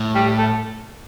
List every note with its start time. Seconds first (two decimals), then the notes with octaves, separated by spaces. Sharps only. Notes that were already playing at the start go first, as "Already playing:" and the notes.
Already playing: A2
0.15 G3
0.38 A3